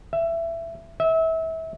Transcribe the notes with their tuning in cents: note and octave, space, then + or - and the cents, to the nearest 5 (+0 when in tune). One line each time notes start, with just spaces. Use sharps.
E5 +15
E5 -30